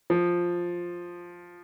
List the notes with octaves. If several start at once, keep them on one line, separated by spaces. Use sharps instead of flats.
F3